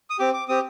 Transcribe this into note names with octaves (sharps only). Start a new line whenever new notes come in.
D#6
C4 G4 D6
D6
C4 G4 D#6